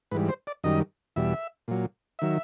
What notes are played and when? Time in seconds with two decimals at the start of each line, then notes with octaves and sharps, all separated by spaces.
0.11 G#2 E3 G3 B4
0.29 C5
0.47 D5
0.64 F#2 D#3 G3 D#5
1.16 E2 B2 G3 E5
1.68 A#2 F#3
2.19 D#3 F#3 E5